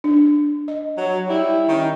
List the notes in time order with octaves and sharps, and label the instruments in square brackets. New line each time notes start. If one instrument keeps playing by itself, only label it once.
[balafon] D4
D#5
[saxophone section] F#3
G3 E4
D#3 C#4 D#4